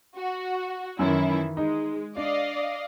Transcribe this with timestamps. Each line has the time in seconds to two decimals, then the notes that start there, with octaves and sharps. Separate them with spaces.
0.17 F#4
0.99 F#2 D#3 E3 E4
1.57 G#3 D#4
2.17 D4 D5 D#5 F5